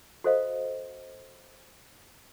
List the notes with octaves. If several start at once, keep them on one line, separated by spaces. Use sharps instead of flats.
F#4 A4 C5 D#5 F5